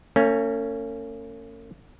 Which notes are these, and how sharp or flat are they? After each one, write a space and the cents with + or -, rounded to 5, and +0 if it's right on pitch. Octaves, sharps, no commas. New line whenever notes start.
A#3 -45 C#4 +0